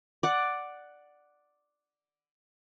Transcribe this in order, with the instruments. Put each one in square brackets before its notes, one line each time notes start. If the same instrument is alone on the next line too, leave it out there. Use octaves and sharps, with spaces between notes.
[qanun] D5 F#5